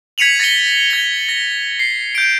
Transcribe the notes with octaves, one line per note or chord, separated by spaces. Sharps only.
G#6 B6 C#7 D#7 F7 F#7
A6 A#6 C#7 D#7 G7
G#6 G7
A#6
C7
G6 D7